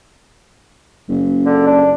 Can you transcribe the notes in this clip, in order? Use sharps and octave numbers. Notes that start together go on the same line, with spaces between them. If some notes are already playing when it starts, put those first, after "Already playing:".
F#1
D3
D4